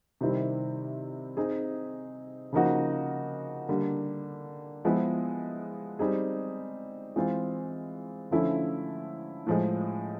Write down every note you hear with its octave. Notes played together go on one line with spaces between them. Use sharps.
C3 D#3 G3 C4 E4
C4 D#4 G#4
C#3 F3 A#3 D#4 F#4
D3 G3 A#3
F3 G#3 B3 E4
G3 C4 D#4 G#4
E3 G#3 C4 F4
D3 F3 A3 C#4 E4
A2 F3 G#3